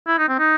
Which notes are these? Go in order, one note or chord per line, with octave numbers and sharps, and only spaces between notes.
E4
D#4
C4
D#4